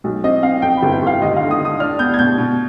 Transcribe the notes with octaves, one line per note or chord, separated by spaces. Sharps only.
B1
C4 D#5
C4 F5
F2 G5
B5
G1
G5
G1 F5
D#2 D#5
D3 F5
D#6
D3 D#6
D4 F6
B3 G6
G#6
B2 G6
B2